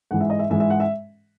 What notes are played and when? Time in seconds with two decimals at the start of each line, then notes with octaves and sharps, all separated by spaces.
0.11 G#2 E3 G#3 F#5
0.21 E5
0.30 D#5
0.39 E5
0.50 G#2 E3 G#3 E5
0.60 E5
0.70 F#5
0.80 E5